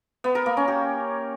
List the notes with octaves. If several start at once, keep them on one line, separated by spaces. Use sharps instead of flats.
B3
A#4
A#3
C#4
G4